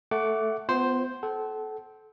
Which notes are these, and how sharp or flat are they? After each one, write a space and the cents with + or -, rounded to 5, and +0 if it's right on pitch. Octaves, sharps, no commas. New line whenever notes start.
A3 +0 F#5 +20 D6 -15
B3 +30 F4 +0 C5 +0
A4 -25 F#5 +35